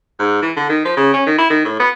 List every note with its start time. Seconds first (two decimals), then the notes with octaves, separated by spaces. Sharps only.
0.20 G#2
0.42 E3
0.57 D3
0.69 D#3
0.85 F3
0.97 C#3
1.14 C#4
1.26 D#3
1.38 E4
1.50 D#3
1.65 A2
1.80 B3